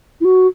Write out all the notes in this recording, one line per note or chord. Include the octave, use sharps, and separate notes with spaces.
E4
F#4